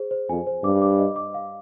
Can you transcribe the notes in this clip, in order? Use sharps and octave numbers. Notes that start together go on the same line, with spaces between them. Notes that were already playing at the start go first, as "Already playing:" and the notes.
Already playing: G#4 C5
C5
F2 G#5
C5
G2 D6
D6
D#5
D6
F5